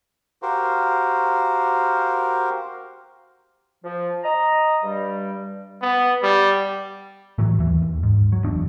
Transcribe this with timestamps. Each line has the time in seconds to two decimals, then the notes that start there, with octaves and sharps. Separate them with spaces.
0.42 F#4 G4 A#4 C5 F5
3.84 F3
4.24 D#5 A#5
4.84 G2 G3
5.82 B3
6.23 G3
7.38 A2 E3 F#3
7.58 D#2 E3
7.82 D#2
8.03 G#2
8.32 F#3
8.44 F#1 E2 B2 D4